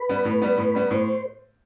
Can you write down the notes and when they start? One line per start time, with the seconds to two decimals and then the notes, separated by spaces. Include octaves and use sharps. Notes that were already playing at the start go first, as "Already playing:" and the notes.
Already playing: B4
0.09 G3 B3
0.25 A2
0.42 G3 B3
0.58 A2
0.75 G3 B3
0.91 A2 C5